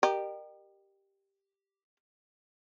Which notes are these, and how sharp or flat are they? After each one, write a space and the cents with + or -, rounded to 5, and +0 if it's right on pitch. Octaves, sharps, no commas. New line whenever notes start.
G4 +0 A#4 +0 D#5 -40